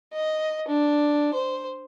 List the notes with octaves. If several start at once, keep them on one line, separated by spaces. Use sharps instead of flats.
D#5
D4
C5